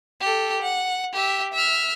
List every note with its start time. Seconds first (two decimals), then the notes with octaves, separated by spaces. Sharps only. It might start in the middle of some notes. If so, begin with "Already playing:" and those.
0.21 G4 A4
0.62 F#5
1.13 G4 E5
1.53 E5 F6